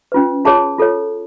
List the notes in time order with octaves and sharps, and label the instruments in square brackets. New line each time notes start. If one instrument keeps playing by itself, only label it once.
[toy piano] C#4 F4 B4
F4 G#4 C#5 A5
F4 A4 C#5